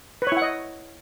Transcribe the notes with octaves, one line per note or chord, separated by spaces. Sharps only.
E4 B4 C#5 D#5 F#5